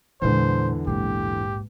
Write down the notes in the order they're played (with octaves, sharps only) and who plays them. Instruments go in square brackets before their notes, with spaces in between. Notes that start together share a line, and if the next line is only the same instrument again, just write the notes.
[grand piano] E2 D3 [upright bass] A#2 G#3 [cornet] C5
[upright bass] A#1 G#2 [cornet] G4